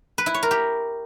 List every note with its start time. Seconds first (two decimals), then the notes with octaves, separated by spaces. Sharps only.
0.18 B4
0.26 E4
0.34 C#5
0.43 A#4
0.51 G4